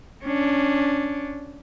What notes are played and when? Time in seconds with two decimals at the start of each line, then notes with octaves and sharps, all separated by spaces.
0.24 C#4 D4